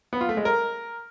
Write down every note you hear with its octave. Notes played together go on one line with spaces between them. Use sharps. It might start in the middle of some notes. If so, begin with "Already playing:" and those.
B3
F4
A3
G#3
A#4